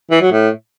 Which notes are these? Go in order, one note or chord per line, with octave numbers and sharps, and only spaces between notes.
E3
F#3
A2